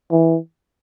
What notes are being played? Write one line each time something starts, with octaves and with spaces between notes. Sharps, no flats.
E3